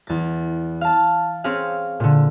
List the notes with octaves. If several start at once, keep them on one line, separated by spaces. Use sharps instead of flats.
E2 A6
F5 A5
C4 C#4 G#4 F5
A#2 D3